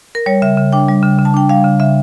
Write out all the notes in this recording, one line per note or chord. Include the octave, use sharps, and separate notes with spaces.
A#4
G3 C#5
C#3 E5
C#3
D4 G5
G3
C#3
C#3
A5
D4 G5
G3 F5
C#3
C#3 E5